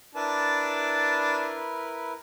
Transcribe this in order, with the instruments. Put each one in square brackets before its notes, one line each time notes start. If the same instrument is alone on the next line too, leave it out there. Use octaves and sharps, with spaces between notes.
[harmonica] D4 A5 [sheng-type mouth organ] E4 A#4 B4